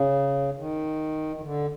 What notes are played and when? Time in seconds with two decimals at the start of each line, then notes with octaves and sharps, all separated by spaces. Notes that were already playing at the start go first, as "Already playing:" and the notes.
Already playing: C#3
0.58 D#3
1.36 D#3
1.43 D3